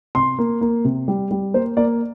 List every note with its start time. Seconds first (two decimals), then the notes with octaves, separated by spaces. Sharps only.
0.15 C3 C6
0.39 A#3
0.61 A#3
0.85 C3
1.08 G3
1.31 G3
1.54 A#3 C5
1.77 A#3 D5